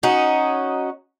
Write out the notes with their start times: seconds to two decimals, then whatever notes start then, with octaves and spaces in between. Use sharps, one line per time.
0.03 C#4 D#4 F#4